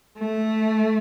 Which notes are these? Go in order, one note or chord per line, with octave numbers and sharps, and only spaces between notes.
A3